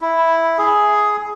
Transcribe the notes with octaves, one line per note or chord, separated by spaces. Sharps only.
E4
G#4